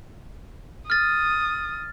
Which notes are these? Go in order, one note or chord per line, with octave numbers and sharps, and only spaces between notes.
D#6 F6 A6